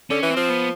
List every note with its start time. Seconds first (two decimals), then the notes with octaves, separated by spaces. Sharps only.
0.10 D3 C#4
0.23 E3
0.30 C4
0.36 F3
0.49 B3